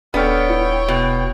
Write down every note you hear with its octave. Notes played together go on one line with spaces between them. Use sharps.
D#1 B3 D4 A4 C#5 G5 F6
E4
B2